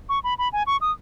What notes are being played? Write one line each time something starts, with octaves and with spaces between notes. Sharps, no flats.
C#6
B5
B5
G#5
C#6
D#6